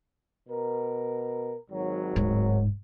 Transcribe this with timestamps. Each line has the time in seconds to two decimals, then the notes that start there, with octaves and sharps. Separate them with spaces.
0.49 B2 A#4
1.70 G#1 F#3
2.16 D1 G#2